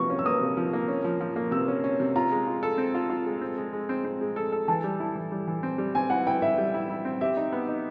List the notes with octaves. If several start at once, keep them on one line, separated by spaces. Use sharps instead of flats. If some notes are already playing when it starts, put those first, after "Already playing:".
Already playing: C3 F3 A#3 C#6
C#4
E6
A#3 D#6
C3
F3
A#3
C#4
F3
F3
A#3
C3 E6
C#4
C#4
C3
F4 A#5
G#3
F4
A4
C4
F4
F4
G#3
C4
G#3
G#3
C4
C4
G#3
A4
A4
E3 A5
G3
E4
E3
G3
E3
C4
G3
C4 G#5
E4 F#5
E4 G5
E4 E5
G3
E4
E4
C4
G4 E5
D#4
B3
D#4